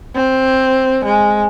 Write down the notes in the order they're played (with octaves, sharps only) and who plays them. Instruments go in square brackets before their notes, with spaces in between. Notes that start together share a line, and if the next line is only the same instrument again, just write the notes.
[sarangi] C4
G#3